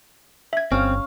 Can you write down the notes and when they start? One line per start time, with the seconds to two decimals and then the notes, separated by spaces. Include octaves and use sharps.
0.53 E5 G#6
0.72 G1 C4 C#4 F5